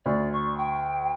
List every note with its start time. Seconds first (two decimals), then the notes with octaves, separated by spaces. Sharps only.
0.06 D2 D5
0.33 C#6
0.58 G5